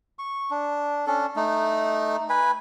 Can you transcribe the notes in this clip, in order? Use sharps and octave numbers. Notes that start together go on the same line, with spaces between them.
C#6
D4
C#4 D4 A4
A3 D#4
B4 G#5 B5